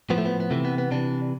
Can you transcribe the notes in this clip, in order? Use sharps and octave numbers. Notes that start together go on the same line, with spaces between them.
A2 F3 B3
A3
B3
B3
C3 E3 A3
B3
B3
C3 E3 D4